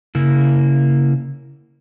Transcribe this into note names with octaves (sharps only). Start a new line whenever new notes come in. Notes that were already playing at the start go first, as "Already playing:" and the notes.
C#3 A#3 E4